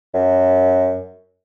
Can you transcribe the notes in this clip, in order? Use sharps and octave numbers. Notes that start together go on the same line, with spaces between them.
F#2